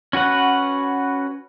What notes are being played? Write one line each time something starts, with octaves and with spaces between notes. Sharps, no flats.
C#4 F#4 B4 F#5